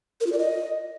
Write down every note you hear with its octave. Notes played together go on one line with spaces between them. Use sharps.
A#4
F4
D5
D#5